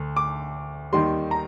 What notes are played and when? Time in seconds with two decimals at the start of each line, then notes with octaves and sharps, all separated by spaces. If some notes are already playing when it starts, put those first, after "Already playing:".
Already playing: D2
0.16 D6
0.93 D#2 D#3 G3 C6
1.31 A#5